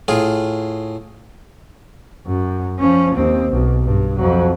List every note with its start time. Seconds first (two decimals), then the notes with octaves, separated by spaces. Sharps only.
0.08 A2 F4 G#4
2.27 F#2
2.79 F3 C#4
3.15 D#2 C4
3.51 B1
3.84 G2
4.17 F2 F#3